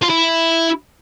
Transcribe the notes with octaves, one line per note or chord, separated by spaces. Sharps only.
F4
E4